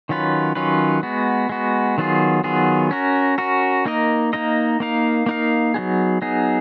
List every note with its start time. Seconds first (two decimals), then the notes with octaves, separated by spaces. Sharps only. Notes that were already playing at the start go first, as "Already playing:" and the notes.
0.09 D#3 F#3 C#4 F4 B4
0.55 D#3 F#3 C#4 F4 B4
1.03 G#3 B3 F#4
1.49 G#3 B3 F#4
1.98 D#3 F#3 B3 F4 G#4
2.44 D#3 F#3 B3 F4 G#4
2.91 C#4 F#4 A#4
3.38 C#4 F#4 A#4
3.86 A#3 D#4 A#4 D#5
4.33 A#3 D#4 A#4 D#5
4.80 A#3 D#4 A#4 F5
5.26 A#3 D#4 A#4 F5
5.74 F#3 B3 D#4 G#4
6.22 F#3 B3 D#4 G#4